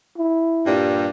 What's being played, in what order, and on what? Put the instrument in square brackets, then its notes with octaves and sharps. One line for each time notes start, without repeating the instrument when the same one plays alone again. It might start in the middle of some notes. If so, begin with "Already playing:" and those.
[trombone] E4
[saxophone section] G2 A#2 G3